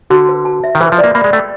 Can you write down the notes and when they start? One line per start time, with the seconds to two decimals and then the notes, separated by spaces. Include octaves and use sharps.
0.10 D3 F#4
0.29 B4
0.45 A5
0.64 E5
0.75 D#3
0.81 E3 B4
0.92 F3
0.98 D5
1.04 A#3
1.15 A#3 B5
1.24 G#3
1.33 A3 G5